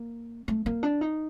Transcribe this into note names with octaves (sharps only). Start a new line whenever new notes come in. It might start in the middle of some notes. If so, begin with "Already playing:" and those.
Already playing: A#3
A3
A#3
D4
D#4